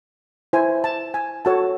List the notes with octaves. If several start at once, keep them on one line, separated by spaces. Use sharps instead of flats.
E4 C5 G#5
A5
G#5
F#4 A4 C#5 A5